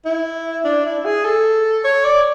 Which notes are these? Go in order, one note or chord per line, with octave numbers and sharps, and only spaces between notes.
E4
D4
E4
G#4
A4
C#5
D5